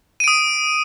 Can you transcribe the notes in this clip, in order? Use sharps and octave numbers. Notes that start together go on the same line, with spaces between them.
D#6 D7 D#7